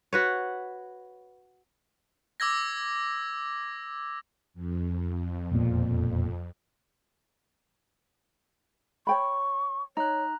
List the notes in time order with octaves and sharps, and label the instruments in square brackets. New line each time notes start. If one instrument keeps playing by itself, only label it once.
[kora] F#4 B4 C#5
[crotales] D6 E6 G#6 A#6
[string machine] F2
[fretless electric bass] E1 A#2
[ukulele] C#5 G5 B5 [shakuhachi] C#6
[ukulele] D#4 [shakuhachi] C#5 [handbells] A#5 F#6